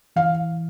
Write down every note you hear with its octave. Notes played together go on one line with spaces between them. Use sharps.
E3 F5